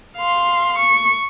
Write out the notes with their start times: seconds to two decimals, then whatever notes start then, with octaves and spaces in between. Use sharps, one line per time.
0.17 F5 C6
0.78 C#6